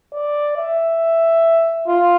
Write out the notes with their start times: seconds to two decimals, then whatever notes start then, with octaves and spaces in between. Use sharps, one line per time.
0.13 D5
0.57 E5
1.87 F4